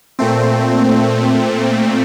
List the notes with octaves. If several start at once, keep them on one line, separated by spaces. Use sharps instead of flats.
A#2 A3 C4